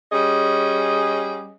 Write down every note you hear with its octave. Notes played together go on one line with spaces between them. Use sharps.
G3 C#4 G#4 D#5